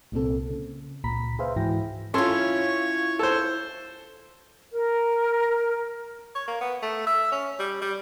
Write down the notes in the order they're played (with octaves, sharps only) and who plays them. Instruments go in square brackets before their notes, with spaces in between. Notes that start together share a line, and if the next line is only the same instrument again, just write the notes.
[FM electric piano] C2 A#2 A#3 C4 A4
C#3
C#2 A#2 A#5 B5 B6
G#4 B4 C5 E5 F5
G#2 E3 E4 F#4 G5 A#6
[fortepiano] C#4 A4 C6 [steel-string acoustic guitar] E4 F4 [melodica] C#5 C#6
[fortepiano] A4 C5
[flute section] A#4
[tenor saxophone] C#5
A#3
B3
A3
E5
C#4
G3
G3